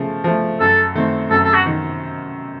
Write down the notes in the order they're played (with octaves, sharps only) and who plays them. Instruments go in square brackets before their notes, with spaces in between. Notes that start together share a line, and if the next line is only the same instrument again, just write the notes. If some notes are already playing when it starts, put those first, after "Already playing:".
Already playing: [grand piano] C#3 F3 A3
F3 A3
[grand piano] F#2 [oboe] A4
[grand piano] D#3 A3 C4
[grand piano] F#2 [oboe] A4
[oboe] A4
F#4
[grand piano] D#3